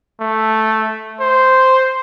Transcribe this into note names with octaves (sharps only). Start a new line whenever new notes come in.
A3
C5